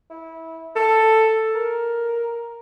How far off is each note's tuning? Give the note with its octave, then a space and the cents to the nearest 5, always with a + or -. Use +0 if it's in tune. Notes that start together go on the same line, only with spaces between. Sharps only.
E4 -20
A4 +5
A#4 +5